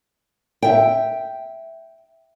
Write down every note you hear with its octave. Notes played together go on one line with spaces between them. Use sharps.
E5 G5